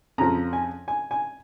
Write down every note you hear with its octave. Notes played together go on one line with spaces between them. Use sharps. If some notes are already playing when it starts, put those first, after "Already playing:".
F2 C#3 F3 A#5
G#5
G#5
G#5